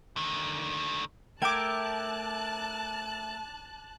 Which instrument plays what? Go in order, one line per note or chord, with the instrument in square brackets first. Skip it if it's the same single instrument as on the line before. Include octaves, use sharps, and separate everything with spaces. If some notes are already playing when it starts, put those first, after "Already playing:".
[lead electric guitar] D3 D#3
[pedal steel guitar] A3 A#4 E5 [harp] G5 [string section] A5 F#6 [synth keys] D6 G#6